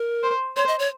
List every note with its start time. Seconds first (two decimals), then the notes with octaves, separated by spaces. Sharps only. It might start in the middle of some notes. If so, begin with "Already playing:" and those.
Already playing: A#4
0.23 C5
0.56 C5 C#5
0.68 D#5
0.79 C#5